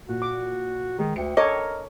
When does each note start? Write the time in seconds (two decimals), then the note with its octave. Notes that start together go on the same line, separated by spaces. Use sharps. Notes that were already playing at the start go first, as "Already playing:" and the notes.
0.09 A#2 F#4
0.22 D6
0.99 D#3 G#3
1.16 D2 G5 C#7
1.37 A4 A#4 C#5 D#5 D6